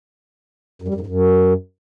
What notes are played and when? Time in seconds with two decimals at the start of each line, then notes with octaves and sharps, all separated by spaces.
0.82 F#2
0.88 G3
0.94 F#2
1.00 G#2
1.07 F#2